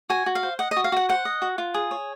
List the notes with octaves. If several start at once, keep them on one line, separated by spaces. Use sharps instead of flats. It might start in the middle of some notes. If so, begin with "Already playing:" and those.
F#4 G#5
F#4
F5
C5
D#5 F#5
D#5
F#4
F5
F#4 F#5
C5 F#5
D#5
F#4
F4
G#4
C#5